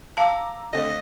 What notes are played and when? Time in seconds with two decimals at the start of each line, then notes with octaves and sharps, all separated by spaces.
0.17 F5 A5 A#5 D6 E6
0.73 D3 A3 C4 D#5